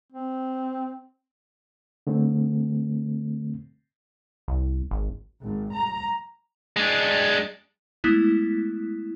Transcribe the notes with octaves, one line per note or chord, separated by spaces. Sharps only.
C4
D3 A3 C4
C2
G#1
G#1
A#5
G#3 D4
G#3 A3 B3 E4